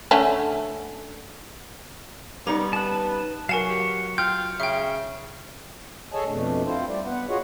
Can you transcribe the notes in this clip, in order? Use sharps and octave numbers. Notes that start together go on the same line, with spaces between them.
D3 A3 C#4
G3 B3 C#4 D#4 A#5
B4 A5
F#3 A#4 F5 F#5 G#5 C#6 E7
G4
F4 G5 F6 G6
C#3 E5 G5
G#4 A4 C#5 D#5 G#5 A5
F2 B2 A3 D4
C4 E4 F4 C5
G3 D5
B3 B4 F#5
F4 F#4 G#4 C#5 D#5 F#5